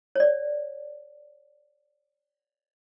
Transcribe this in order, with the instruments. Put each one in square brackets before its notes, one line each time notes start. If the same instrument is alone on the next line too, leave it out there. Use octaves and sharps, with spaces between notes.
[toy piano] C#5 D5